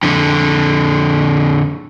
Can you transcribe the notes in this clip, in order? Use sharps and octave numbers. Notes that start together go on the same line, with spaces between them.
F2 D3